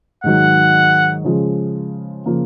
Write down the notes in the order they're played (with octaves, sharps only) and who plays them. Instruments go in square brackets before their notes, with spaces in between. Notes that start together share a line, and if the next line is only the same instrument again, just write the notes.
[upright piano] G#2 D#3 F#3 [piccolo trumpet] F#5
[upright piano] C#3 F3 G#3
C#3 F3 A#3